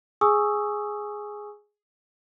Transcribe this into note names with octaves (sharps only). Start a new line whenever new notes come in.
G#4 G#5 C#6 D#6 E6